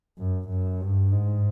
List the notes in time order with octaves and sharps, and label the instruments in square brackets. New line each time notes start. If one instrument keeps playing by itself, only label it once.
[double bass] F#2
F#2
G2
G#2